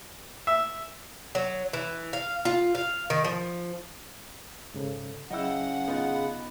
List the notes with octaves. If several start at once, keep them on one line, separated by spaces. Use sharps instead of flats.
E5
F#3
E3
F5
F4
F5
D#3
F3
G#2 C#3 A4
C#3 F#3 E4 D#5 F#5 G5 E6
B3 D#4 F4
B5